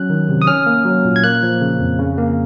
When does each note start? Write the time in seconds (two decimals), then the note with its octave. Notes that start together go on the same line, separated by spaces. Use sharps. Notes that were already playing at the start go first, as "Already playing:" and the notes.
Already playing: F#3 C#4 F#6
0.10 D#3
0.29 C3
0.42 D#6
0.47 C#4 F6
0.66 A#3
0.85 F#3
1.05 A#2
1.16 G#6
1.24 A#3 F#6
1.43 F3
1.61 C#3
1.80 F2
1.98 C#3
2.18 A#3